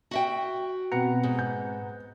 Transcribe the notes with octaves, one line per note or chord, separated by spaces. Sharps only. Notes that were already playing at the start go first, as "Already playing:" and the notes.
F#4 E5 G5
B2 C4 B4 F#5 A#5 C#7
G#2
G6